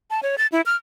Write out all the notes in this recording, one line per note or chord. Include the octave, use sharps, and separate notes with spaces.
A5
C#5
A6
E4
F6